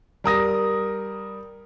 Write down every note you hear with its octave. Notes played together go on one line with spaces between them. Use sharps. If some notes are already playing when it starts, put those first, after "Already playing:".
G3 A#4 D#6 A#6